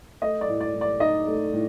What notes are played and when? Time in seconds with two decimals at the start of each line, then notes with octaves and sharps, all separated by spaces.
0.21 A3 D#5
0.41 D5
0.48 A2
0.60 D5
0.74 A2
0.81 D5
1.00 D#4 D#5
1.27 A3
1.53 A2